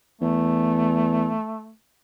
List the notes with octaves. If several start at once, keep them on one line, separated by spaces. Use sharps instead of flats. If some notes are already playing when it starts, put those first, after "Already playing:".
E2 A3